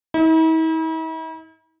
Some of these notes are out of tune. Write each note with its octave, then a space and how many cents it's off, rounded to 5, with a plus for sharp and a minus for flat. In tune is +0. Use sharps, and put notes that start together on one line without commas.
E4 -45